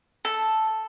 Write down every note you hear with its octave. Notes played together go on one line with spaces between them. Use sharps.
A4